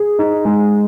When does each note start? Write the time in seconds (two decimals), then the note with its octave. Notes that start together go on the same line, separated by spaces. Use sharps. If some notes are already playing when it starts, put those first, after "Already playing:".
Already playing: G#4
0.19 D#4
0.45 G#3